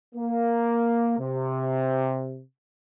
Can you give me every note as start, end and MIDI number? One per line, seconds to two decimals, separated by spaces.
0.14 1.17 58
1.18 2.40 48